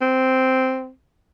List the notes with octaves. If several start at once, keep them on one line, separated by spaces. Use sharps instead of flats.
C4